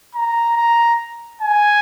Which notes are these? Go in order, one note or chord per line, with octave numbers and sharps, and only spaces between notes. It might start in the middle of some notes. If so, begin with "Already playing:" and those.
A#5
A#5
G#5